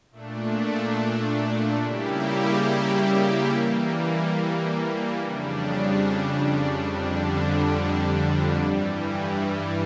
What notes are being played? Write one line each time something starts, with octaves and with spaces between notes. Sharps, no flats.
A#2 A3 D4
C#3 G3 A#3 E4 G4
E3 G3 A#3
F2 C#3 G3 D4
F2 D3 G3 D4
G2 E3 G3